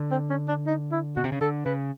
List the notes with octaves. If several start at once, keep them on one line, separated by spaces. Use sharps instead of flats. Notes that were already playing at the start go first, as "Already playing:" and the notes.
Already playing: D3
C4
C#4
D4
D#4
E4
B2 F#4
C3
C#3
D3 A4
C#3 B4